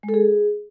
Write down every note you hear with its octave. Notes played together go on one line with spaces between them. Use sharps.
G#3
A4
G#4